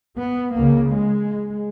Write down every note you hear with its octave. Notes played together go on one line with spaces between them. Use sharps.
B3
C#2 C#3 A#3
G#3